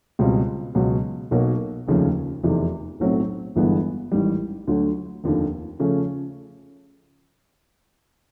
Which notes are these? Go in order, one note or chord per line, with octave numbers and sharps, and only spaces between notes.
C#2 B2 G3 C4 F4
C#2 B2 F#3
B1 B2 F#3 A#3
F1 D#2 C#3 F3 A3
F1 E2 C3 D#3
B1 A2 F#3 A3 C4
G1 G2 E3 G#3 B3
A1 G#2 D#3 G3
D2 D3 F#3
F1 D#2 D3 F3
C#3 F3 A3 C#4